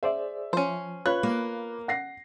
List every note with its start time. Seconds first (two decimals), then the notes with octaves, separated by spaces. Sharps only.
0.03 G#4 C5 D5 E5
0.53 F3 C#4 C5
1.06 F4 B4 C#5 F5 B5 F#6
1.23 A#3
1.88 F#5 A#6 C7